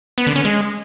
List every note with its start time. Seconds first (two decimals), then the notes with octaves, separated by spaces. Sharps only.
0.18 B3
0.27 D3
0.36 C#4
0.45 G#3